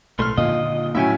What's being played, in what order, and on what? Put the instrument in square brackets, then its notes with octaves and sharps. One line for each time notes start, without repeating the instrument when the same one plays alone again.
[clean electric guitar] B1 A2 A3 [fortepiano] C6 F6
[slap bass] A#2 D3 D#3 [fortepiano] F4 [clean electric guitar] D#5
[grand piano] A2 F#3 C#4 [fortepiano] E5 G5 G#5